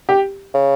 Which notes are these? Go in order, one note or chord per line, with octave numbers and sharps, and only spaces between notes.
G4
C#3